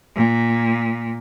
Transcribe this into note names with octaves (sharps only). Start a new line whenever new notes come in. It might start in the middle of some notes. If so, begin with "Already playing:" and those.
A#2